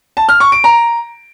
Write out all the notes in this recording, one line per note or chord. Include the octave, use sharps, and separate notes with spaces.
A5
F6
C#6
D7
A#5